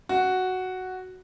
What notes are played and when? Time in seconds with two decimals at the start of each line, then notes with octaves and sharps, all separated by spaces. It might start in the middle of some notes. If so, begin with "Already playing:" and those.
0.09 F#4